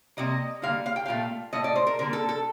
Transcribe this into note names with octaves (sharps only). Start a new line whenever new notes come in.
C3 G3 A#3 D#5
D3 G3 A#3 F5
F5
G5
A#2 A3 F5
A2 A3 D#5
D5
C5
A#4
D3 G3 A#3 A#4
A4
A4